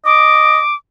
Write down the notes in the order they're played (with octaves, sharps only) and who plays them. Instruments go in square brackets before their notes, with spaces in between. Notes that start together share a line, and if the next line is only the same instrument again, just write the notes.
[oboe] D#5 [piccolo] D6